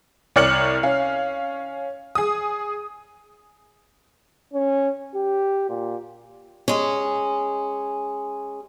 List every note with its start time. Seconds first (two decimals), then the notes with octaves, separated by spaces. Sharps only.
0.36 C2 C#5 D5 F6 C#7 F#7
0.83 C#4 F5
2.15 G#4 D#6
4.53 C#4
5.15 G4
5.69 A#2
6.68 G#3 C#4